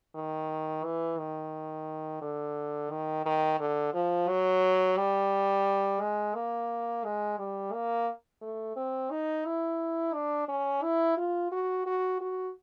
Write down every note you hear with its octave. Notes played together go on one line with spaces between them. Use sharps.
D#3
E3
D#3
D3
D#3
D#3
D3
F3
F#3
G3
G#3
A#3
G#3
G3
A#3
A3
C4
D#4
E4
D4
C#4
E4
F4
F#4
F#4
F#4